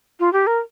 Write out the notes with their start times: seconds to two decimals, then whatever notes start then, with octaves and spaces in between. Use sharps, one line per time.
0.20 F4
0.33 G4
0.47 A#4